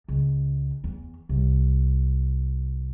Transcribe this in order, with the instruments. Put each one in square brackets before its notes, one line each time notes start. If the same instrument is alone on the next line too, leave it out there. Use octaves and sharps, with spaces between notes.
[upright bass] C#2
E2
C2